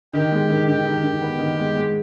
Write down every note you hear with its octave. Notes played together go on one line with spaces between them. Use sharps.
D#3 G4
G#3
D#3
D#3 G4
D#3
D#3
B3
D#3
G#3
G#3